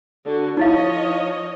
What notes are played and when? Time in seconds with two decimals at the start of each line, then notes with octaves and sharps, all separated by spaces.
0.23 D3 F#4
0.57 F3 D#4 E4 C#5 D#5 F5